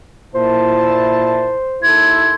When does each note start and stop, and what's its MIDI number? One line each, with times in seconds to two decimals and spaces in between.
0.35 1.57 46
0.35 1.57 64
0.35 1.90 72
0.35 1.57 81
1.82 2.34 39
1.82 2.34 64
1.82 2.34 69
1.82 2.34 84
1.82 2.34 92